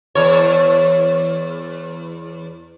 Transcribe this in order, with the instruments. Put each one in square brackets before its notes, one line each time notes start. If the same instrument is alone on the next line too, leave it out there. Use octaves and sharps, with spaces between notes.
[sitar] E2 C#5